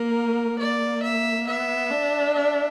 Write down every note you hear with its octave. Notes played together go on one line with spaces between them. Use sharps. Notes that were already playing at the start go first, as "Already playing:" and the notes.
Already playing: A#3 A#4
A#3 D5
E5
B3 E5
D4
E5